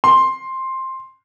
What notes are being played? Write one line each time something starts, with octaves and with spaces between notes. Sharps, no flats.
C6